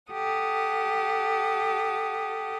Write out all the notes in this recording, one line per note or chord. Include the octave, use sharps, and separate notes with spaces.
G4 A4 F#5 D#6